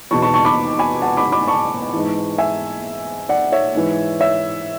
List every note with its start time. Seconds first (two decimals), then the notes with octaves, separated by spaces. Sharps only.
0.11 E2 B2 A5 C#6
0.22 A5 C#6
0.34 A5 C#6
0.45 B5 D6
0.79 G#5 B5
1.02 F#5 A5
1.17 B5 D6
1.32 B5 D6
1.48 A5 C#6
1.93 G#2 E3
2.38 E5 G#5
3.29 D5 F#5
3.52 C#5 E5
3.75 G#2 E3
4.20 C#5 E5